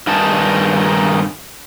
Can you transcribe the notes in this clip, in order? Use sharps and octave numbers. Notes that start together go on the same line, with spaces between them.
G2 D#3 D#4 G#4 A5